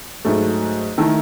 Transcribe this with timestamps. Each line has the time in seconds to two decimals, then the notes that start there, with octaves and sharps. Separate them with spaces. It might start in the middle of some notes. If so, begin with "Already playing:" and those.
0.25 G#2 F#3 A3
0.98 D#3 A3 E4 A4